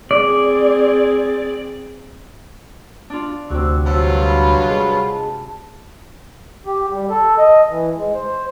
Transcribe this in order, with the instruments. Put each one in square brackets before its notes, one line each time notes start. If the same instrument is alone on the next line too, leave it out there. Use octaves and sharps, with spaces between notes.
[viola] C4 G#4 [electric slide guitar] D5
[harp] D4 F4
[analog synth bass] D2 [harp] C3 F#4 [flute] E6
[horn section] G2 F#3 F4
[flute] B5
[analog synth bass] G#3 [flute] B5
[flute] A5
[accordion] G4
G3
A4
D#5
E3
G#3
C5